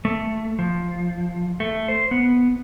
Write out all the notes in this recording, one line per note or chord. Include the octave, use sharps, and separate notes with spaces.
A3
F3
A3
C5
B3